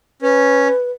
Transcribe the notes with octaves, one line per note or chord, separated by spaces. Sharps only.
C#4 B4